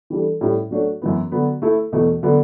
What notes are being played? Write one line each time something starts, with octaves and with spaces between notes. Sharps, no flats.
E3 G3 D4 A4
A2 G3 C#4
F#3 A3 D4 F#4 C#5
F#2 E3 B3
D3 F#3 B3
A3 E4 A4
E2 B2 A3
D3 F#3 B3